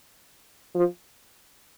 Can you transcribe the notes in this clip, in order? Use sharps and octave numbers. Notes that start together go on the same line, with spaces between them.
F3